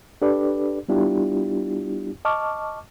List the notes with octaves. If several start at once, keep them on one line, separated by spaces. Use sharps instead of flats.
D4 G4 A4 B4 D5
G3 B3 D4 E4 F4 G4
D#5 A5 C#6 D6 F6